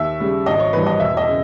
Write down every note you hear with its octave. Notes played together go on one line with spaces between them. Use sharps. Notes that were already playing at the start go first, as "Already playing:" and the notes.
Already playing: D#2 E5
C#3 G3
G#1 D#5
C#5
G2 E3 B4
D#5
E1 E5
D#5
C#3